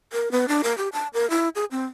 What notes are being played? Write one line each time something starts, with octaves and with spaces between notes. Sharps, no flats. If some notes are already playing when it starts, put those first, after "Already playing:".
A#4
B3
D4
A#4
G4
A5
A#4
E4
G#4
C4